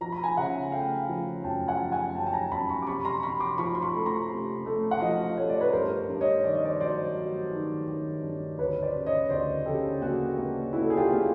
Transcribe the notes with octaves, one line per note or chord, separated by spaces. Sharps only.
F3 A#5
B5
G#5 A#5
C#3 E5 F#5
A3 F5 G5
F3
F#2 G5 A5
F#5 G#5
F3
F#5 G#5
F#2 G5 A5
A5
G#5 A#5
F#2 A5 B5
B5 C#6
D6
C3 B5 C#6
A#5 C6
C3 B5 C#6
C6 D6
F3 B5 C#6
C6
B5 C#6
A3
A#5 C6
C3
A3
F#5
F3 D#5 F5
A3 C#5
D5
B4 C#5
G2 A#4 C5
G2
C#5 D#5
D#3 D5
D#5
C5 D5
F#3 C5 D5
F#3
D#3
D#3
G2
D2 B4 C#5
C5 D5
C#3
C#5 D#5
D2 C5 D5
C#3 G4 A4
A#3 F#4 G#4
A#3
A#3 E4 F#4
A4
G#4
F4 G4
A#3